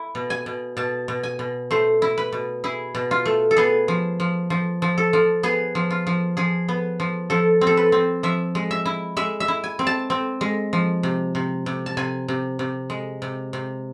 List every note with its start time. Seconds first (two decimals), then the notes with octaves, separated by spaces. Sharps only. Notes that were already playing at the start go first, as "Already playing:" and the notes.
Already playing: E4
0.15 B2
0.30 G#5
0.46 B2
0.77 B2 A5
1.08 B2
1.23 G#5
1.39 B2
1.71 A3 C5
2.02 E4
2.18 B4
2.32 B2
2.64 E4 G#4
2.95 B2
3.11 F4
3.25 A3
3.51 A4
3.57 B3 G#4
3.88 F3
4.20 F3
4.50 F3
4.82 F3
4.98 A4
5.13 F3
5.43 B3 G#4
5.75 F3
5.90 F4
6.07 F3
6.37 F3 G#4
6.68 B3
7.00 F3
7.30 F3 A4
7.61 C4
7.67 A4
7.77 B4
7.92 C4
8.23 F3 E5
8.55 G#3
8.71 E5
8.85 E4
9.17 G#3 E5
9.40 E5
9.48 E4
9.64 G#5
9.79 C4
9.87 A5
10.10 C4
10.41 G#3
10.73 F3
11.03 C3
11.35 C3
11.66 C3
11.86 A5
11.97 C3 G#5
12.28 C3
12.59 C3
12.90 G#3
13.22 C3
13.53 C3